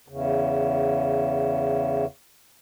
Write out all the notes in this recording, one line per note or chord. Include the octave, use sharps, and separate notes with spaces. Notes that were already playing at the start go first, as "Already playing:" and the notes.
E2 C#3